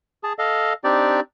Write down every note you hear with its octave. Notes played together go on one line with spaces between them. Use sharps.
G#4 A5
A4 D#5 F5
C4 D4 D#4 G4 D5